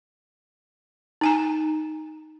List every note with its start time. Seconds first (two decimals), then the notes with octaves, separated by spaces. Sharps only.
1.21 D#4 G#5 A#5